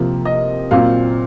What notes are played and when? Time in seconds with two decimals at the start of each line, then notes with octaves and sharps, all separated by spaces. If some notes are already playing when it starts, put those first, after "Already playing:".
Already playing: C3 F3 A#3
0.25 D#5
0.71 A#2 F#3 C4 F5